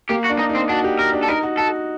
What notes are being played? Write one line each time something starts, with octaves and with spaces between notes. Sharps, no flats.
A#3 G4
F#4
D4
D#4
D#4
C4
D4 F#4
G4
F#4 A#4
D4
A4
D#4 A#4
F#4
F#4 A4